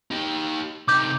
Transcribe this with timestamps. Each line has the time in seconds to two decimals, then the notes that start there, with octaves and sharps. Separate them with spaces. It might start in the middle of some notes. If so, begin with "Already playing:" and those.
0.11 D#4 G4
0.88 C3 D#4 D6 G6